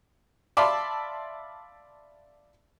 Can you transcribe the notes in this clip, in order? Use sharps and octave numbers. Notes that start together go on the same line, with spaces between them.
D5 E5 F5 A5 B5 C6